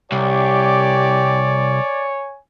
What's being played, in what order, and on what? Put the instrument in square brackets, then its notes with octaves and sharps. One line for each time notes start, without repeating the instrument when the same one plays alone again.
[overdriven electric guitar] C2 [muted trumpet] G4 [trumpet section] C#5 G#5 [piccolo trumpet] D5